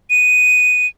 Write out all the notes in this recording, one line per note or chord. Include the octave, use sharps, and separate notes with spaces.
D#7